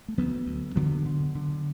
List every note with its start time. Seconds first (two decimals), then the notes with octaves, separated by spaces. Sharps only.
0.08 A3
0.18 D2 F#3 B3
0.46 D2
0.76 D3 F#3 B3
1.05 D3
1.35 D3